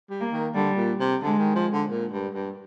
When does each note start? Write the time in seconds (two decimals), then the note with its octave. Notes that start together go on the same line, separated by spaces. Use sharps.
0.10 G3
0.21 A#3
0.32 D#3
0.55 D3 G3
0.76 A#2
0.99 C3
1.22 D3 G#3
1.39 D#3
1.55 F3
1.73 D3
1.90 A#2
2.12 G2
2.34 G2